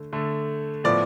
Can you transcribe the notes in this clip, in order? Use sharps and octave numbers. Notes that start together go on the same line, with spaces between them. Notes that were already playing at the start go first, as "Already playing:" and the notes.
Already playing: D3 A3
D3 A3
A2 F3 B3 D5